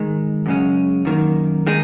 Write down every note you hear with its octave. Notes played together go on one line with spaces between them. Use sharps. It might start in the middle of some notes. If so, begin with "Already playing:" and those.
Already playing: G#2 D#3 G#3
F#2 C#3 G#3 C#4
F#2 D#3 A#3
D#3 G#3 D#4